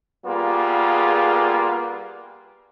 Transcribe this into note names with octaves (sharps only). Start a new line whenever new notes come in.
G3 A#3 B3 F4 G#4